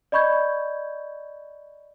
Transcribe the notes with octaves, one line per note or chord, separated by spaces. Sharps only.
D5 D#5 B5 C#6 G6 G#6